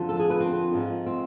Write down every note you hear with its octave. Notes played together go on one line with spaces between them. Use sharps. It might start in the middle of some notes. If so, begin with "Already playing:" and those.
Already playing: F2 D3 F3
A4
G#4
B4
C4
G#2 F3 G#3
C4